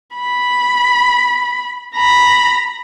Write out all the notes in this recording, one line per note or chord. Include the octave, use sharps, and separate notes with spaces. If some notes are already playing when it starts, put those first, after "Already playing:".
B5
A#5 B5